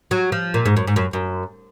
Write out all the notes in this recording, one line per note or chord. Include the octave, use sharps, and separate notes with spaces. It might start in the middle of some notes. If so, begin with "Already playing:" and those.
F#3
F3
A#2
G#2
F#2
G#2
F#2
F#2